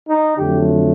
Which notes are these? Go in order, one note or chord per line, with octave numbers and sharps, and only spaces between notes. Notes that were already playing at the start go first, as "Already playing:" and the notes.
D#4
F2 D3 F#3 A3 G4